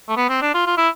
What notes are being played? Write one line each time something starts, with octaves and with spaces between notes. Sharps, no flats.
A3
B3
C4
D4
F4
F4
E4